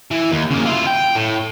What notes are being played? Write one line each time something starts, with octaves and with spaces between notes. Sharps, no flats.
E3
D#2
C#3 A#3
E4 F4
G5
A2